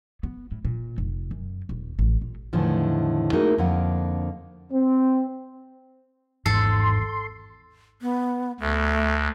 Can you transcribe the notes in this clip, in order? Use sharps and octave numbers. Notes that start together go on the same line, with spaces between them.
B3
A2
A#2
F1
F#2
D#1
A1
A#2
E2 A2 D3 D#3 F3
A3 A#3 D#4 F#4 G#4 A#4
F2 D3 A#3 F#5
C4
G#1 E2 G#2 A4 C6
B3
D2 A3